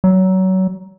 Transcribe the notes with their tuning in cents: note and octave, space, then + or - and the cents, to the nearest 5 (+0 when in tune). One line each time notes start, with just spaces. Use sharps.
F#3 +25